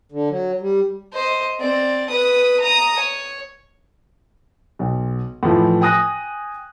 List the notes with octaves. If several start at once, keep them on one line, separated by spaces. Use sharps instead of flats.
D3
F#3
G3
C5 D#5
C4 D5
B4 D#6
A#5 D#6
C#5
B1
A2 E3 F3
G5 G#5 D#6 F#6 A#6